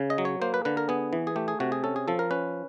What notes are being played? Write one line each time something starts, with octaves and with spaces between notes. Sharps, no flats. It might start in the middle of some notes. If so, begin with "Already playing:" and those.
Already playing: C#3
D#5
F#3
C#5
A#3 C5
B4
D3 B4
A#4
B3 G#4
E3
G#4
A3 G4
G#4
C3 F#4
G#4
C#4 A4
G#4
F3 A4
A#4
C#4 B4